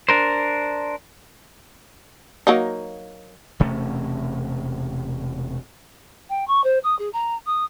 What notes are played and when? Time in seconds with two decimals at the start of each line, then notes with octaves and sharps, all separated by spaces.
0.09 D4 A#4 C5
2.47 F#3 A#3 D#4
3.60 E1 C3 A3 C#4
6.29 G5
6.47 C#6
6.64 C5
6.84 D#6
6.99 G#4
7.13 A#5
7.46 D#6